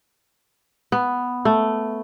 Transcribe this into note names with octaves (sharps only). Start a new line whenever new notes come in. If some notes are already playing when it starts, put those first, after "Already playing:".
B3
A3